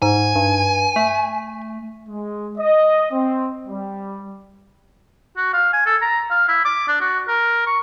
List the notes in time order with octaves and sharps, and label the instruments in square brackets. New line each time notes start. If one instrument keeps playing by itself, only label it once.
[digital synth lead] G#2 [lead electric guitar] G#5
[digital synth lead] G2
A3
[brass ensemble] G#3
D#5
C4
G3
[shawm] F#4
F5
G#5
A4
A#5
F5
E4
D6
D4
F#4
A#4
C#6